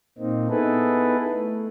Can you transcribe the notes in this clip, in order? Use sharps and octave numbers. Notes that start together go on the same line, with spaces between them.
A#2 A#3 C4 D#4
B3 D#4 E4 G#4 A4 B4
A3